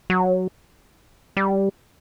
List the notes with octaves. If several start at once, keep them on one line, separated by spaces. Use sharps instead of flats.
F#3
G3